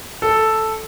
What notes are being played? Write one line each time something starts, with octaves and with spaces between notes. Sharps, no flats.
A4